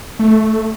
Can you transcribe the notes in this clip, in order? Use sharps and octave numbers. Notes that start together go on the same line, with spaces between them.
A3